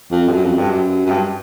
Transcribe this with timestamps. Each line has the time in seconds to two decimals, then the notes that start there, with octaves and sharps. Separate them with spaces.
0.11 F2
0.28 G2
0.31 F#2
0.45 F2
0.58 G2
0.71 F#2
1.06 F#2
1.10 G2